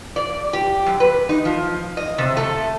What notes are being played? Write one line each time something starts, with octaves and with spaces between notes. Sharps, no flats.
D5
G4
F#2
B4
D#4
F3
D#5
C3
A3